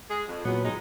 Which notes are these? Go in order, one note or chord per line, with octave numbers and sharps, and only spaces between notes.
G#3 G#4
F2
E2 A#2 F#3 B3
G#3 D#4